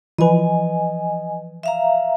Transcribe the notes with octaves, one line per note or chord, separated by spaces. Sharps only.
E3 F3 B4 D#5 G#5
E5 F5 A#5